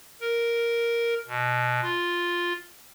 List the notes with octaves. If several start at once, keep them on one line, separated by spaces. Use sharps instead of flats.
A#4
B2
F4